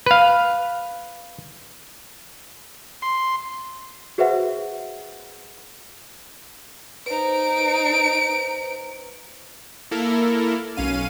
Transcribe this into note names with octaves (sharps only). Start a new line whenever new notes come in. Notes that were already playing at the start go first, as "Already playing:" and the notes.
B4 F5
C6
F#4 G#4 B4 C5 E5 F#5
D#4 B4 C5 D7
A#3 E4 A4 A#4
B1 C#4 F5 D#7